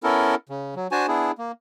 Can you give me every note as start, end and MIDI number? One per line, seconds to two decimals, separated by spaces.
0.03 0.35 59
0.03 0.35 61
0.03 0.35 64
0.03 0.35 69
0.03 0.35 70
0.49 0.74 49
0.76 0.87 54
0.92 1.07 62
0.92 1.07 66
0.92 1.07 72
0.92 1.07 80
0.92 1.07 81
1.08 1.31 59
1.08 1.31 62
1.08 1.31 64
1.08 1.31 68
1.38 1.52 58